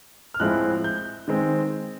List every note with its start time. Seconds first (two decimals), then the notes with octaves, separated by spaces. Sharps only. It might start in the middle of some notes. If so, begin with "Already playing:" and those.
0.34 F6
0.40 A2 F3 G#3 C4 E4 F#6
0.84 G6
1.28 D#3 G#3 C4